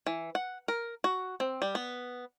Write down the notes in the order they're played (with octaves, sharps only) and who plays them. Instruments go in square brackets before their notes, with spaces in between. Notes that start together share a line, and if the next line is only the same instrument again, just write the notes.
[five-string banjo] E3
F#5
A#4
F#4
C4
G3
B3